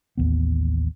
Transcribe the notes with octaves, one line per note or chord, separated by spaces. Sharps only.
A1 D#2 B2 B3